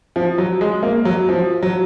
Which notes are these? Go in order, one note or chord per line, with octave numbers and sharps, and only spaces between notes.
F3
F#3
G#3
A#3
F#3
F3
F#3